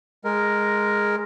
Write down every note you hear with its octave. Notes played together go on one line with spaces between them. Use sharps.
G#3 A#4